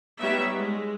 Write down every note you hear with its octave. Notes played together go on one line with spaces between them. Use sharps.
G3 B3 D#4 C#5 E5
G#3